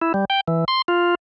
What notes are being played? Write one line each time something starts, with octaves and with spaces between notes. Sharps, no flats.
E4
G3
G5
E3
C6
F4